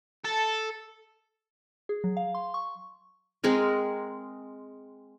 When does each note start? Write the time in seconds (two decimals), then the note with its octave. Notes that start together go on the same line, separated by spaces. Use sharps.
0.24 A4
1.89 G#4
2.04 F#3
2.17 F5
2.35 C6
2.54 C#6
3.44 G#3 C4 G#4 A#4